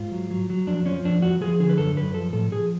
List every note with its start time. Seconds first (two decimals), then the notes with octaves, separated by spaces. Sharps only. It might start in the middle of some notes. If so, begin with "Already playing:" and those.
Already playing: G#2 F4
0.12 F#3
0.31 F#3
0.50 F#3
0.67 F2 D4
0.86 F3 C#4
1.05 F2 D4
1.22 F2 F#4
1.41 F3 G#4
1.60 D3 G#4
1.69 B4
1.78 F#2 A4
1.96 F#2 B4
2.14 F3 A4
2.33 A2 A4
2.52 F3 G#4